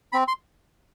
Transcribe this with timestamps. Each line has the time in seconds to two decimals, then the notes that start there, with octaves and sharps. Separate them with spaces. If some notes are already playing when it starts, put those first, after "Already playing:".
0.12 C4 B5
0.28 C6